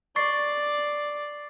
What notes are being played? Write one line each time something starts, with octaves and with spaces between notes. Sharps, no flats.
D5 C#6 A6 C7